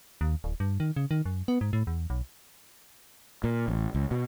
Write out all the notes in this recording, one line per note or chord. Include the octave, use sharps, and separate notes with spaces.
D#2
D1
G2
D#3
C#3
D#3
F#2
B3
G#2
A2
E2
B1
A#2
A1
C#2
B2